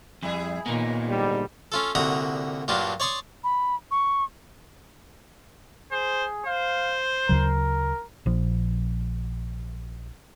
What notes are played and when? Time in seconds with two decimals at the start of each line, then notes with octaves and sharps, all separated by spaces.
0.23 F2 G3 E4 G#4
0.66 D#2 A#2 B3 D#4 A#4
1.09 G#2 D3 G3
1.72 C#4 F4 A4
1.95 C2 A#2 D3 F#4 A#5 D#6
2.68 G2 A#2 F#3 D4 F4
3.00 C#5 D5 C6 C#6 D#6
3.44 B5
3.91 C#6
5.92 G#4 C5
6.46 C5 F5
7.29 D2 C#3 F#3 A#4
8.26 A#1 F3